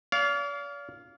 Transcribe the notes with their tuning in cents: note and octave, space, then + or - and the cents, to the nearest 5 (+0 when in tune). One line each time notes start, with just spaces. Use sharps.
D5 -45 F5 +0